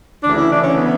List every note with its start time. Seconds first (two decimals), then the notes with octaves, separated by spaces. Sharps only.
0.23 D2 C#3 E3 D4
0.36 E4
0.50 D4
0.63 C#4
0.76 B3